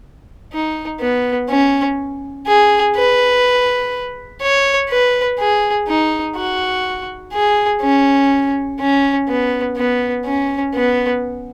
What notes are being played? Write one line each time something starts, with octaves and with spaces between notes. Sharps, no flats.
D#4
B3
C#4
G#4
B4
C#5
B4
G#4
D#4
F#4
G#4
C#4
C#4
B3
B3
C#4
B3